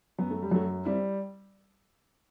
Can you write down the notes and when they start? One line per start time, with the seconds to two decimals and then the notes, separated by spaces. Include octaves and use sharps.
0.18 F#2 B3
0.31 A3
0.42 G3
0.51 F#2 F#3 A3
0.85 G3 C4 E4